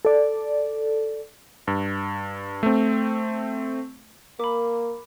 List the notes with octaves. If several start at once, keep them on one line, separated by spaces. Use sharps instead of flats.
A4 D5
G2
A3 C4
A#3 A#4 B5 D6